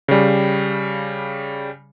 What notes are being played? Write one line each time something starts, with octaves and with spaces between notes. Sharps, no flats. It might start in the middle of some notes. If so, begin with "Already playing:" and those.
C#3 G3